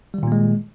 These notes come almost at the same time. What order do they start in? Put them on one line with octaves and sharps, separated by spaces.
G3 D#3 A#2 A#3 G#3